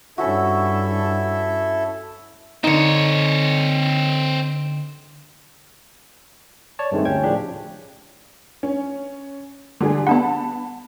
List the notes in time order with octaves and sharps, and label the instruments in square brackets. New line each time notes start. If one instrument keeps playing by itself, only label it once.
[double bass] G2 [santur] C#4 F#4 [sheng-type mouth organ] E4 A4 E5
[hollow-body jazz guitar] D3 D#4 [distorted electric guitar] C4 C#5
[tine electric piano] C#5 D5 A5
G2 C3 D#3 G#3 A3
D2 C#4 G5 G#6
A2 C#3 F3 D4 G4
[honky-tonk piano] C#4
D3 G3 G#4
[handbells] B3 D4 F#5 [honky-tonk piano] A5 B5